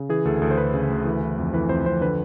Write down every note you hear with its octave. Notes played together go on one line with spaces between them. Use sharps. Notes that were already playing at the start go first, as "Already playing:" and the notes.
Already playing: C#3
E3 G#4
D2 A4
D2 A4
C5
D2 B4
C#3
D2
E3
E3
F2
E3 B4
F2 C5
F2 C5
D3 B4